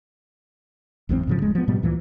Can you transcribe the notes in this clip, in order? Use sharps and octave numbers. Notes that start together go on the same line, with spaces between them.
G#1 E2 D3 C4
G#2 C#3 F3
D#1 G#3
F3 B3
G#2 B2 G3 B3
D2 A#2 E3 F3